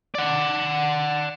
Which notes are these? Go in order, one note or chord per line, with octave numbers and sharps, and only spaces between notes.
D5 F#5